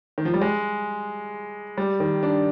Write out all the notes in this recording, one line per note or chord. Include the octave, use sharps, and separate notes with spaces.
D#3
F3
G3
G#3
G3
D#3
D4